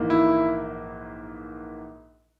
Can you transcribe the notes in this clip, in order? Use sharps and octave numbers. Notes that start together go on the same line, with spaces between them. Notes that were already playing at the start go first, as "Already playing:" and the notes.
Already playing: A#1 G#2 E3 A#3
E4